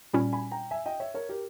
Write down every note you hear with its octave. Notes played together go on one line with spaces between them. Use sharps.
A#2 G3 C#4 G#5 B5
G#5 B5
G5 A#5
E5 G#5
D#5 G5
C#5 E5
A#4 C#5
G4 A#4